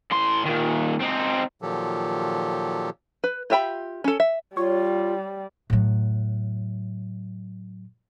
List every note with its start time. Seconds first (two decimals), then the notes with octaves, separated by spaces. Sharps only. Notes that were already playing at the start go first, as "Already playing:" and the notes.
0.12 A2 C6
0.45 A#2 D#3
1.01 C4 D#4
1.62 A#2 D#3 F3 F#3 G4 A4
3.24 B4
3.50 F4 G4 E5 G5 B5
4.04 C#4 A4
4.20 E5
4.57 G3 F4 C#5
5.70 A2 F#3